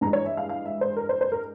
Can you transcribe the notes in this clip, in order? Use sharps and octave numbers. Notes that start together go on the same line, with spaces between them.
G2 E3 G#3 A#5
C#5
E5
F5
F5
E5
C5
A#4
C5
C5
A#4